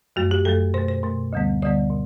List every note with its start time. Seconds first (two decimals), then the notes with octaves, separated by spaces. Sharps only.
0.16 F#2 F#3 A3 F#4
0.31 G4
0.45 F#2 F#3 A3 A4
0.74 B2 A3 C5
0.88 C5
1.03 B2 A3
1.33 D2 D3 G3 B3
1.62 D2 D3 G3 B3 D5
1.90 B2